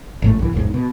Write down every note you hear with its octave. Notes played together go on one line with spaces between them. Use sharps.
A1 G#2 A3
B1 G2 E3
E1 B1 G#2
B2